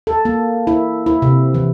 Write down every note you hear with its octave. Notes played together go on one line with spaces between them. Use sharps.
A4
A#3
E4
E4
C3
E3